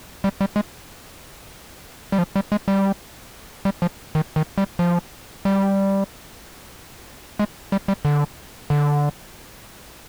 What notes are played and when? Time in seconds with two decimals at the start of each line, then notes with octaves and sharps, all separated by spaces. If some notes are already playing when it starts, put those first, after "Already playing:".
0.24 G3
0.41 G3
0.56 G#3
2.12 G3
2.18 F3
2.36 G3
2.52 G#3
2.68 G3
3.65 G3
3.82 F3
4.15 D#3
4.36 D#3
4.58 G3
4.79 F3
5.45 G3
7.39 G#3
7.72 G3
7.88 G3
8.05 D3
8.70 D3